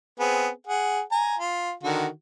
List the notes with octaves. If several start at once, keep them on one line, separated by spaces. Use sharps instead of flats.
B3 C4 G#4
G#4 F#5
G#5 A#5
F4
D3 D#3 F#4